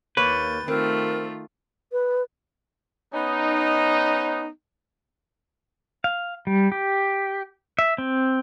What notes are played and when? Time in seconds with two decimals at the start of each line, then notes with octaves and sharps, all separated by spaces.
0.17 D#2 A#3 B4 C#5 G6 A6
0.68 D#3 A3 C4 F4 A#4
1.92 B4
3.14 B3 C#4 D#4
6.04 F5
6.47 G3
6.72 G4
7.79 E5
7.98 C4